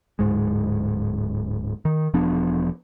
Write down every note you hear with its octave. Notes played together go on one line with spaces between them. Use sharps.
D1 E2 G#2 G#3
D#3
E1 F3 B3 D4